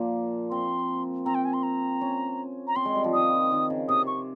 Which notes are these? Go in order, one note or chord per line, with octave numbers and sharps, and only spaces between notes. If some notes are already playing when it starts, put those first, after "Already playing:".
Already playing: A#2 F3 A#3
C4 C6
C4 A#5
G5
G#5
C6
A#5
C#4
A#5
C4 C6
G#3
G3
F3
D#3 D#6
D#3
C#3
C3 D#6
C#6